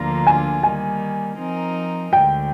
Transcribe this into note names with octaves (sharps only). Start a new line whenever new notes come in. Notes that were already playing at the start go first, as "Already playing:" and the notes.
Already playing: D2 D3 F3 A#3 F4 A#5
G#5
D#3 G3 A#3 G#5
F3 C4 D#4 A#4
D2 D3 G#3 G5